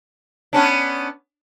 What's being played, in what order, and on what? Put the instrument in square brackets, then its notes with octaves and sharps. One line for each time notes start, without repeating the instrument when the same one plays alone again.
[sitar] B3 C#4 D4